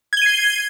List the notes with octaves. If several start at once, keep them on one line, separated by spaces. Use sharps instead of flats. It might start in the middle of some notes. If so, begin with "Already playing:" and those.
G#6 C7 D#7 G7